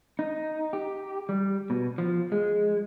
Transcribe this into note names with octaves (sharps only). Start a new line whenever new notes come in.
D#4
G4
G3
B2
F3
G#3